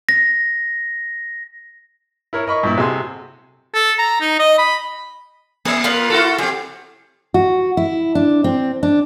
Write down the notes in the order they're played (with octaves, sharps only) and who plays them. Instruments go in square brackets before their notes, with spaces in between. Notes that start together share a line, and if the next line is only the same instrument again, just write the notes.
[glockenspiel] A#6
[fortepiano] E4 A#4 C#5
A#4 D#5 B5 C#6
G2 A#2 E4
C3 F#4 G#4 A4 G#5 C6
[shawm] A4
A#5
D#4
D#5
B5
[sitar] A#3 [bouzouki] G#4 E5
[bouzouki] F4 A#4 B4
[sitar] E4 F#4 A4
[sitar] C4 G4 [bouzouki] G#4
[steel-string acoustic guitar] F#4
E4
D4
C4
D4